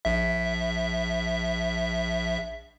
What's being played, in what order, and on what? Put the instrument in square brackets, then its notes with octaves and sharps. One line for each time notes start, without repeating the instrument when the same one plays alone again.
[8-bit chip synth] A#1 E5